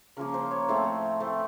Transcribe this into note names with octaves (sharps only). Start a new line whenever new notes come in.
C#3 F3 A#3 A#4
C5
C#5
A2 F3 A3 C4 C5
E3 A3 C4